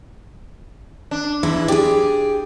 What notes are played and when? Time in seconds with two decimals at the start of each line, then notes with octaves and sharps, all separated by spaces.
1.11 D4
1.43 E2 E4
1.68 G4 G#4 D5